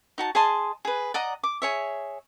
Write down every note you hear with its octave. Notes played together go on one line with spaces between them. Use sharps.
D#4 F#4 A5
G#4 D#5 A5 C6
G#4 B4
D5 D#5 F#5 A#5
D6
G#4 C#5 E5